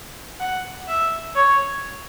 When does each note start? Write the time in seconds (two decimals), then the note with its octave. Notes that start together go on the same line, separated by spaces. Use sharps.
0.40 F#5
0.88 E5
1.35 C#5